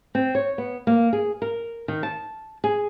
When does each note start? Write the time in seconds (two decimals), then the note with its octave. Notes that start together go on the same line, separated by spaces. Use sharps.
0.15 C4
0.35 C#5
0.58 B3
0.87 A#3
1.13 G#4
1.42 A#4
1.88 D#3
2.03 A5
2.64 G#4